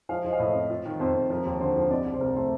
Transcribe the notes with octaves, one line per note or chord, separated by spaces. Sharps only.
F3 F5
F3 D#5
F5
A2 D#5
C4
F4
D#3 A#4
F2 C5
F2
F3 A#4
D#2
D3 C5
F3
C3 D5
C2
C5
C2 A#4
A3 C5